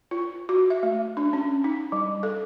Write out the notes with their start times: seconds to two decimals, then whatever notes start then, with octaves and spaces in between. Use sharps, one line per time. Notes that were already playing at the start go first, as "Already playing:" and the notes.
0.11 F4
0.49 F#4
0.70 E5
0.83 A3
1.17 D4
1.33 C#4
1.64 D#4
1.92 G3
2.23 A4